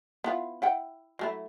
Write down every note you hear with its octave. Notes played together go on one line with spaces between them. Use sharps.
B3 E4 F4
E4 F#5 G5
F#3 A3 E4